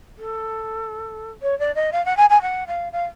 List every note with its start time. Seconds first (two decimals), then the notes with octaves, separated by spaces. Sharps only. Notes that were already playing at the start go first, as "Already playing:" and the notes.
0.18 A4
1.42 C#5
1.59 D5
1.75 D#5
1.92 F5
2.05 F#5
2.17 G#5
2.30 G#5
2.42 F#5
2.68 F5
2.93 F5